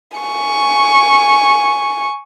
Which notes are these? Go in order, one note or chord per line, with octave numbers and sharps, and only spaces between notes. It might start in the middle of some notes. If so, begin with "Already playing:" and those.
G#5 C#6